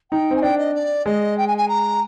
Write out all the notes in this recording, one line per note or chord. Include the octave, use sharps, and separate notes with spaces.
D#4 G5
C4
G#5
D4 G5
D#5
D5
G#3 D#5
G5
G#5
G#5
A#5